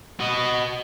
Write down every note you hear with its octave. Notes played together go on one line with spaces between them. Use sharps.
F#4 D#5